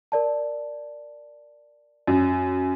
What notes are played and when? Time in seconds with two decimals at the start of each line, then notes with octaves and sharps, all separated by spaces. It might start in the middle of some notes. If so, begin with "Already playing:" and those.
0.12 A#4 D5 A5
2.07 F#2